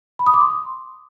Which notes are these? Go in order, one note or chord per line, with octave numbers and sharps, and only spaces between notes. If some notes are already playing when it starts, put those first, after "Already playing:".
B5
D#6
D6
C6